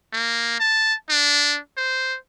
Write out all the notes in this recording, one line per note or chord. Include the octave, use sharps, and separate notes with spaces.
A#3
A5
D4
C5